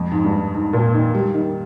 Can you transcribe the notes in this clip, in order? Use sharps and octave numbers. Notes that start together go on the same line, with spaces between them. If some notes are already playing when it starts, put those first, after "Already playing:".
Already playing: F2
G#2
G2
G#2
A#2
D#3
G3
D#3